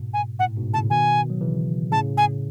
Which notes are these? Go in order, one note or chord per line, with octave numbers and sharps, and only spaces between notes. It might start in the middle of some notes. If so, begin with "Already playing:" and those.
Already playing: G#2 B2
G#5
A2 F#5
G#2 B2
A2 C#3 A5
B2 D#3 G#5
F#3
C#3 E3
A2 C#3 A5
G#5